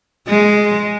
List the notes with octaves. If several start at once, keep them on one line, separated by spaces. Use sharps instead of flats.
G#3